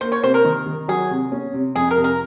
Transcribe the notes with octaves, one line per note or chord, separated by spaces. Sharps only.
A#3 C5
C#5
C3 C5
A#4
D#3
D#3
F#3 G#4
C3
C#4
C3
F2 G#4
A#4
C3
A#4